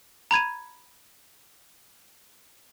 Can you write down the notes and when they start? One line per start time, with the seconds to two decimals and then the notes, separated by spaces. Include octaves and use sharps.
0.31 A#5 B5 G#6 D#7